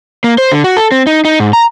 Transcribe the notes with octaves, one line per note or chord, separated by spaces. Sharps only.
A#3
C5
D3
F#4
A4
C4
D#4
D#4
G#2
A#5